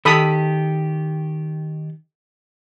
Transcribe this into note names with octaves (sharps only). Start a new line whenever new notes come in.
D#3 G4 A4 B5 D#6